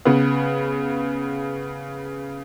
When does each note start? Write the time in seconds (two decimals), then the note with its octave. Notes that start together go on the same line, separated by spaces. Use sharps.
0.05 C#3 B3